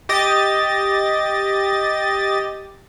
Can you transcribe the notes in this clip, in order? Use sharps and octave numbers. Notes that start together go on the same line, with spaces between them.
G4 D#5 A6